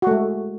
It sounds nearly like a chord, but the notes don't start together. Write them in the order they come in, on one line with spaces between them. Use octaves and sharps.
F#4 A3 G#3